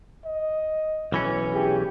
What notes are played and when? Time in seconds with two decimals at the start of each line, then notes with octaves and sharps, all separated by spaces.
0.25 D#5
1.12 B1 E3 C#4
1.54 D4 E4 G4 G#4